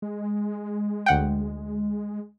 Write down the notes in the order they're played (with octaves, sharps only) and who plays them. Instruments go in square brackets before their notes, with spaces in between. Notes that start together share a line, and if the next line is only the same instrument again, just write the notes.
[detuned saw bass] G#3
[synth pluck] D2 F#5 G5